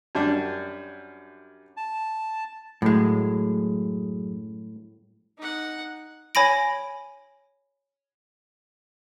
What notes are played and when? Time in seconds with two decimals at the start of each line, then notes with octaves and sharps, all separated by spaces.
0.15 F#2 G3 D4
1.77 A5
2.82 F#2 A2 G#3
5.38 D#4 F#5
6.35 C#5 G#5 B5 A#6 D7